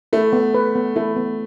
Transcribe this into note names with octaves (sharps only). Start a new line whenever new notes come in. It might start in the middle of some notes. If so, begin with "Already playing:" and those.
A3 E4
B3
B4
B3
A3 E4
B3